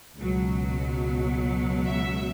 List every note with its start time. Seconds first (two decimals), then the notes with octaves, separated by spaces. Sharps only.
0.17 C#2 B2 F#3
1.85 E5